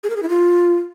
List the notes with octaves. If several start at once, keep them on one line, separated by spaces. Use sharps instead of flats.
G#4
A#4
G#4
E4
F4